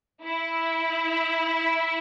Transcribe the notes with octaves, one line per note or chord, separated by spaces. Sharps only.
E4